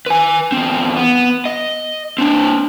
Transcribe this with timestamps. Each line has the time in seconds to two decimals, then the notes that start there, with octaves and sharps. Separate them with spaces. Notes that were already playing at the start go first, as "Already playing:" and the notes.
0.06 B4 G#5
0.52 E2 C4
0.96 B3
1.45 D#5
2.18 C4 D4